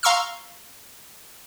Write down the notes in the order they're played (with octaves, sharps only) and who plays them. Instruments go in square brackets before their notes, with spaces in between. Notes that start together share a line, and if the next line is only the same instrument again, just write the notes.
[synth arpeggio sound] F5 A#5 C6 C#6 E6 F6